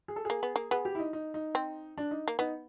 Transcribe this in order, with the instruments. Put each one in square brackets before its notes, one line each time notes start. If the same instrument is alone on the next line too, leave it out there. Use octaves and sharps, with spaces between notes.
[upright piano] G#4
A4
[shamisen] A#3 [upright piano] G#4
[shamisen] B3
A#3
[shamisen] B3 [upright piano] G#4
[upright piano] G4
E4
D#4
D#4
D#4
[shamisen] C4
[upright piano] D4
D#4
[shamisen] A#3
[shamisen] B3 [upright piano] D#4